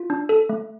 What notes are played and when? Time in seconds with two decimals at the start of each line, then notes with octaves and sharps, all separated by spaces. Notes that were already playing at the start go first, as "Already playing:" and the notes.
Already playing: F4
0.10 D4
0.29 A4
0.49 A3